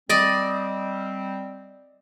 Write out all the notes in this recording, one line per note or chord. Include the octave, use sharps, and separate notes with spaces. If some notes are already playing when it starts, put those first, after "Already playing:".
G3 C4 D5 D#5